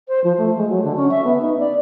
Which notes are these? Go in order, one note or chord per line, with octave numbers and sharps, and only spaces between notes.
C5
F3
A3
G#3
F#3
D3
C#4
E5
B3
D#4
D5